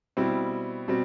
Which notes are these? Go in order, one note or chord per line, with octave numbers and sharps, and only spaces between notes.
B2 G3 C4 E4
B2 G3 C4